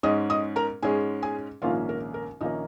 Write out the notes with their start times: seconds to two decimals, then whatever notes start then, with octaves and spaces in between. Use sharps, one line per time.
0.03 G#2 G#3 C#4 D#5 D#6
0.30 D#5 D#6
0.56 A#4 A#5
0.82 G#2 G#3 C#4 G#4 G#5
1.22 G#4 G#5
1.62 A#1 G#2 D#3 A#3 C#4 F4 F5
1.89 A#4
2.14 A#4
2.41 A#1 D#3 A#3 C#4 D#4 D#5